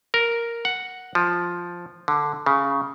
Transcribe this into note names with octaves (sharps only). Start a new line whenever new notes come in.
A#4
F#5
F3
D3
C#3